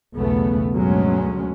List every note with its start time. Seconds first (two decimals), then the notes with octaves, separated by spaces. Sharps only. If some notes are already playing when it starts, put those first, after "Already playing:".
0.15 B1 E2 C#3 A3 B3
0.74 D2 G2 B2 F#3 G#3 C#4